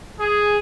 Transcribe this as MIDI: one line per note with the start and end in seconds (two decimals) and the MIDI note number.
0.19 0.58 68